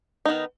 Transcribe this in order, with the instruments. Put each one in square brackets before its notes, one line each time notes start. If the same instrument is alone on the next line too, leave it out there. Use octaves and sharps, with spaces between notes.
[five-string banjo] D#3 B3 D#4